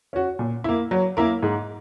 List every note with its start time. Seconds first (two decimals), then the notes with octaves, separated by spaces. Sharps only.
0.13 C#4 F#4
0.39 A#2
0.64 A#3 E4
0.91 F#3
1.17 A#3 E4 A#4
1.43 G#2